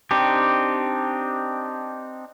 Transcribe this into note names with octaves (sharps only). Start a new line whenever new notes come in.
C4 D4 D#4 G4